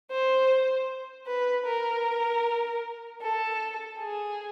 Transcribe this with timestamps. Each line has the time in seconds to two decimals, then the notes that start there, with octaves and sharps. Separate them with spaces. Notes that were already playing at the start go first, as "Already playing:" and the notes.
0.11 C5
1.27 B4
1.66 A#4
3.22 A4
4.00 G#4